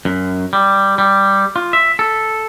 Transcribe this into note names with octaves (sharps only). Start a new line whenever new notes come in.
F#2
G3
G3
F4
E5
A4